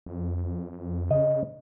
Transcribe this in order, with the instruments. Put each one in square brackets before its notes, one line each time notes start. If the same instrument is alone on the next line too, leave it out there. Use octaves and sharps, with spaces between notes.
[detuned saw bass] F2
[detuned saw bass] C#3 [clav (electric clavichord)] D#5